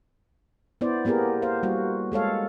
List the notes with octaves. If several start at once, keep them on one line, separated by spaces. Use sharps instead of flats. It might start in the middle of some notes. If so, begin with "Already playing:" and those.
B3 E4 C5 D5
A#3 B3 G4 G#4 A#4
C5 F5
G3 A#3 F#4
G#3 A4 C#5 F5